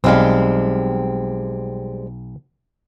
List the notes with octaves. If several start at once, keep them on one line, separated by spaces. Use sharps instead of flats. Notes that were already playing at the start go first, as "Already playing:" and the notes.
B1 G3 G#3 C4 F5